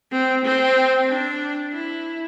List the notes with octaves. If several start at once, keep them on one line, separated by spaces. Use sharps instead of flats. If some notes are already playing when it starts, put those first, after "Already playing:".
C4
C4
D4
E4